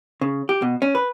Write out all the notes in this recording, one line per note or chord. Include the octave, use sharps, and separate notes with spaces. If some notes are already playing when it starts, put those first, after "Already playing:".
C#3
G4
B2
C#4
B4